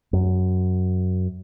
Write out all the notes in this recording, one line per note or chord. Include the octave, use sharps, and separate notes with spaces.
F#2